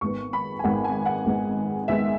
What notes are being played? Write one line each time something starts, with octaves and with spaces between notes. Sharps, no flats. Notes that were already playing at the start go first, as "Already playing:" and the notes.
G#1 G#2 G#3 B3 C#6
B5
G#5
G#1 G#2 G#3 B3 F#5
G#5
F#5
G#1 G#2 G#3 B3
G#1 G#2 G#3 B3 E5